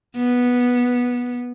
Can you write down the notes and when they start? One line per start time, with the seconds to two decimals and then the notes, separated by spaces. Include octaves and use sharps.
0.17 B3